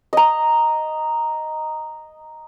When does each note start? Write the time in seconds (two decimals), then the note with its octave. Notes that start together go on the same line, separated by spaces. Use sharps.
0.13 D#5 A#5